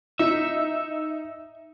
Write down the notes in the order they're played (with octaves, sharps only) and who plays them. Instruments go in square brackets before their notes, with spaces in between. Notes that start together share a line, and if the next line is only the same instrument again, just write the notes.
[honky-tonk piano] D#4 [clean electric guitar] E5